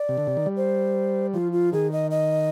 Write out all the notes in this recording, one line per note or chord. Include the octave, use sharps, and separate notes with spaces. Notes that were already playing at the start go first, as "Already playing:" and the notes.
Already playing: D5
C3
D3
C3
D#3
G3
C5
F3 F4
F4
D#3 G#4
D#5
D#5